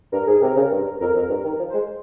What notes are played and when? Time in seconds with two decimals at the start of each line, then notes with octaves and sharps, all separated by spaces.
0.12 G2 A#4
0.27 G#2 G#4
0.42 C3 A#4
0.56 C#3
0.71 G2
1.00 F2 A#4
1.15 F2
1.30 G2
1.44 D#3
1.59 F3
1.69 C5
1.74 G#3